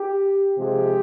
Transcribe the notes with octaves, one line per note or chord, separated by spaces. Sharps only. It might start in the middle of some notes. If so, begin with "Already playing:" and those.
Already playing: G4
C3 F3 G#3 G4